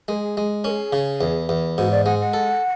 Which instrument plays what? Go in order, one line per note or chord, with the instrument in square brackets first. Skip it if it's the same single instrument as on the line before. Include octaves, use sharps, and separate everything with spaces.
[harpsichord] G#3 [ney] A#4
[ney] G#4
[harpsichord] G#3
[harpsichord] C#4 [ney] A#4
[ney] G#4
[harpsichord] C#3
E2
E2
[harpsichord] G#2 [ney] F#4
[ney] D5
[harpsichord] G#3 [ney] F#5
[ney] F#5
[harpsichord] A4